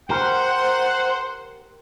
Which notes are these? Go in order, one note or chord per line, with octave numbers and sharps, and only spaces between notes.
G4 A#4 C5 F#5